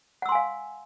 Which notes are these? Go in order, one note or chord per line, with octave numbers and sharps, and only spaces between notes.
F5 F#5 G#5 C6 E6